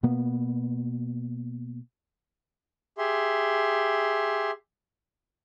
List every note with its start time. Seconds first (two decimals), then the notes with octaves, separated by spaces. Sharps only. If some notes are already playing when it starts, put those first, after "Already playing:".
0.03 B2 A#3 B3
2.98 G4 G#4 E5 C6